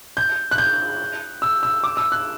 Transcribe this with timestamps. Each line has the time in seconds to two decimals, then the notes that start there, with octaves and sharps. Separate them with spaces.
0.17 G6
0.51 F#6
0.58 G6
1.42 E6
1.63 E6
1.84 D6
1.97 E6
2.12 F#6